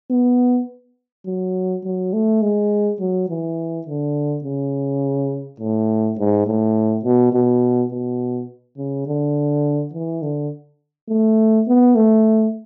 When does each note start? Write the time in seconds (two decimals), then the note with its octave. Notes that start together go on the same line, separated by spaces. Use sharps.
0.11 B3
1.26 F#3
1.84 F#3
2.13 A3
2.42 G#3
3.00 F#3
3.29 E3
3.86 D3
4.44 C#3
5.60 A2
6.18 G#2
6.46 A2
7.04 B2
7.33 B2
7.92 B2
8.78 C#3
9.07 D3
9.93 E3
10.22 D3
11.09 A3
11.67 B3
11.96 A3